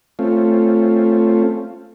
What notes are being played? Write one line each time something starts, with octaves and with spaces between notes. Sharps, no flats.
A3 C4 C#4 F4